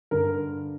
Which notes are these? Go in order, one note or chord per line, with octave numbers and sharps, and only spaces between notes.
G2 D3 A#4